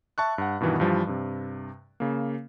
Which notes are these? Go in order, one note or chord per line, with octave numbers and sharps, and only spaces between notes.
E5 A5 C#6 F#6
G2 F#5
G2 B2 D#3 E3 B3
G2 E3 F3 G3
G2 C3
C#3 A#3